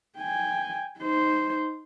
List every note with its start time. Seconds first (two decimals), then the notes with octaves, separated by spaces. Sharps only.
0.19 G5 G#5
0.99 D#4 C5